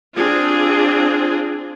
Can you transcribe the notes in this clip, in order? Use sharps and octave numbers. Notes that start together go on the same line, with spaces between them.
C4 D4 F4 G#4